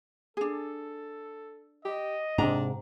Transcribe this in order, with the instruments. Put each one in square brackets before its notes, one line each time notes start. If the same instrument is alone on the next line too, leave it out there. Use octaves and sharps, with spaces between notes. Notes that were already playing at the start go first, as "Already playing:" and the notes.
[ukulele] D4 G#4 [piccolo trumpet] A4
[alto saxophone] G4 [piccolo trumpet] D#5
[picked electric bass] G#2 C3 [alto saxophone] D4 [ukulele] A#5